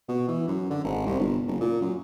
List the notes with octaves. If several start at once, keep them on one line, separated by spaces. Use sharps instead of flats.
B2
E3
F#2
D3
G#1
C2
G1
F#1
A#2
F#2